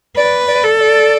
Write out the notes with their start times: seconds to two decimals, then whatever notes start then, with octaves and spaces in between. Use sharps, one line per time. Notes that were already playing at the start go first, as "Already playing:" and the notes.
0.17 B4 D5
0.48 D5
0.63 A4
0.80 D5